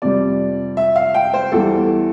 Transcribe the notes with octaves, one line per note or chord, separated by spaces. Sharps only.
F2 C3 G3 D5
E5
F5
G5
C5
E2 E3 G3 A4